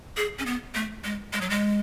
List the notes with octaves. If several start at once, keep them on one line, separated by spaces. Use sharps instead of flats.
G#4
C#4
B3
A3
G#3
G#3
F#3
G#3